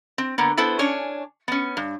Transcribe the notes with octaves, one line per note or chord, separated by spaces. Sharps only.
C4
D3 A#3 B3
B3 E4 A4 B4 C5
C#4 D4 C#5 G#5
B3 C#4
G2